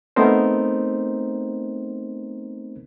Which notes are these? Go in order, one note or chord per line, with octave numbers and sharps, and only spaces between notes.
A3 B3 C4 D#4 A#4 C5